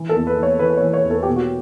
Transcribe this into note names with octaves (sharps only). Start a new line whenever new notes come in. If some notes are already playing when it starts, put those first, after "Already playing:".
Already playing: E3
A4
E2
B4
E3
C#5
E3 B4
B4
E3 C#5
C#5
E2
A4
B2 G4
F#4